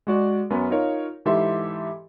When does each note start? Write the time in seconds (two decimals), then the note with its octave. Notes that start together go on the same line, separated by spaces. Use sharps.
0.07 G#3 F#4 D5
0.50 F#2 B3 C#4 B4
0.70 D#4 F4 A#4 C#5 F5
1.25 G#2 E3 G4 A4 E5 C6